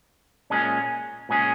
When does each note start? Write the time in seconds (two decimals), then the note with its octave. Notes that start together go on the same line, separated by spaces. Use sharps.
0.50 A#2 G#3 C#4 G#4
1.29 A#2 G#3 C#4 G#4